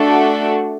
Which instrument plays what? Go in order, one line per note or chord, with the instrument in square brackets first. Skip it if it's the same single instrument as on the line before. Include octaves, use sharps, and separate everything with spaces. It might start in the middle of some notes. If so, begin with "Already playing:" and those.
Already playing: [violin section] A3 D4 F#4 A4